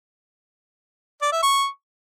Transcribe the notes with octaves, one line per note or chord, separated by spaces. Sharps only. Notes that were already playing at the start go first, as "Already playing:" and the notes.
D5
E5
C#6